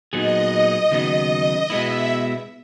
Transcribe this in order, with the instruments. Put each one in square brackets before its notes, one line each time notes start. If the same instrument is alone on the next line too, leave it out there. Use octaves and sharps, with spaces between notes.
[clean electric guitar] A#2 F#3 B3 D#4 G#4 [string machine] D#5
[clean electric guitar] D#2 C#3 F#3 B3 D#4
[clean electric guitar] B2 G#3 B3 E4 [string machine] E5